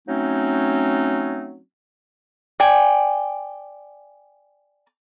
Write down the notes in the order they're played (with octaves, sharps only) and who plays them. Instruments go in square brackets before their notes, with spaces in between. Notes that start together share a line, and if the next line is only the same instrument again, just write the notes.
[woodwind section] F#3 A3 C4 C#4 D#4
[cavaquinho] D5 G5 G#5